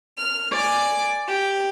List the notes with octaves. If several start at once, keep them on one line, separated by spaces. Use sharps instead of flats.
F6
D5 G#5 D6
G4